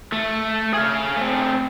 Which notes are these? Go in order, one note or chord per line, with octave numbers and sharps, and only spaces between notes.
A3
G#4 F5
A3 C4